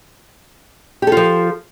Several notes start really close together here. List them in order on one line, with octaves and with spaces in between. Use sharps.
G4 A4 F4 F3